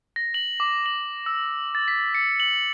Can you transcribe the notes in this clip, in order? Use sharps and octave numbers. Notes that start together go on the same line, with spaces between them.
A#6
F#7
D6
F#7
E6
A6
B6
C#7
F#7